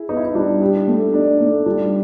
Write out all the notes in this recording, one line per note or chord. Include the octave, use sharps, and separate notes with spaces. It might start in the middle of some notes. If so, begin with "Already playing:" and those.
Already playing: E4 G#4
B3 D#4
E4
D#4
G3 D4
G4
A3
D4 D#4
A3
G3 D4